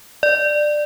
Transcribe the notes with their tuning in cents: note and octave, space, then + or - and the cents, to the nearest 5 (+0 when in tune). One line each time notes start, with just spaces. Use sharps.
D5 +20